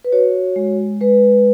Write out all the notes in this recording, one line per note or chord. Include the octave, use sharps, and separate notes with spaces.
B4
F#4 C#5
G#3
G#3 B4